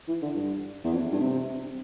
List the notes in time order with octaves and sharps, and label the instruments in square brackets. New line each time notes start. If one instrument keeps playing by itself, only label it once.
[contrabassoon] E3
D3
G2
E2
F2
G2
C3